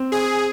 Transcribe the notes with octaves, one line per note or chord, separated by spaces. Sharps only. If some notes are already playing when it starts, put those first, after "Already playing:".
Already playing: C4
G#4